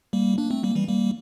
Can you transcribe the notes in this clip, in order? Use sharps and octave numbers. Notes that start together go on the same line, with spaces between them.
G3 A#3
A#3 D4
A3 C4
G3 A#3
E3 G3
G3 A#3